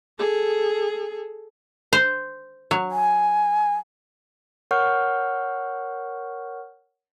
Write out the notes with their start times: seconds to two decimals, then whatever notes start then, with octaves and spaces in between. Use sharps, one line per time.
0.19 G#4 A4
1.93 C5
2.71 F#3
2.91 G#5
4.71 A#4 C#5 F#5 C#6 F6 G6